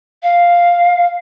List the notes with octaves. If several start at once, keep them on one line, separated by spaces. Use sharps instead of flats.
F5